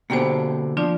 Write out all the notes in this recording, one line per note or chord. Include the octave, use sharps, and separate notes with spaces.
B2 D3 A#3 G4 C5
F3 D4 F4 D5